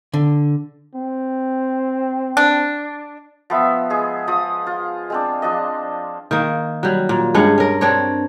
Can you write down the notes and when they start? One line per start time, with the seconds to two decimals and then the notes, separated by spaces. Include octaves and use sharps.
0.13 D3
0.95 C4
2.37 D4
3.50 F3 B3 E5
3.90 G#3 G#4
4.27 F3 D#6
4.67 F4
5.10 G#3 C4 D4
5.42 F3 D4 D#5
6.31 D#3 A#3
6.83 F#3 G3
7.09 A#2
7.34 G2 G#3 C#4 F#5
7.58 C#4 A#4
7.81 C4 D4 C#5